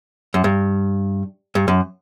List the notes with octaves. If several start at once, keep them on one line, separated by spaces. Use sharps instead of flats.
F#2
G2
G2
F#2